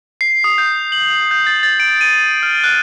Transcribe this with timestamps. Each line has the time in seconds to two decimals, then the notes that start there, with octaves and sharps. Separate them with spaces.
0.21 C7
0.44 D#6
0.58 G6
0.92 F#7
1.31 G6
1.47 A6
1.63 A6
1.80 D7
2.01 D#7
2.43 F6
2.64 F#6